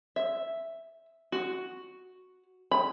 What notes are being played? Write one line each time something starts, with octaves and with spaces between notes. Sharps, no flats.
E5
F#4
B5